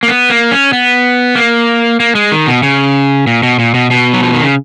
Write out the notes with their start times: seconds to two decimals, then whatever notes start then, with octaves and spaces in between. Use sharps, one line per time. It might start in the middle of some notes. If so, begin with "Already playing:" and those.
0.03 A#3
0.08 B3
0.30 A#3
0.51 C#4
0.73 B3
1.35 A#3
2.00 A#3
2.15 G#3
2.32 D#3
2.47 B2
2.63 C#3
3.27 A#2
3.43 B2
3.59 A#2
3.74 B2
3.91 B2
4.13 F#3
4.23 F3
4.33 D#3
4.44 C#3